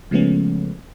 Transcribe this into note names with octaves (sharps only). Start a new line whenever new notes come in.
C#3 F3 G#3 A3 B3 C#4